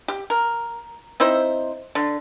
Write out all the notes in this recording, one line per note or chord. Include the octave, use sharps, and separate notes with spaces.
G4
A#4
C4 D#4 E4 C5
D3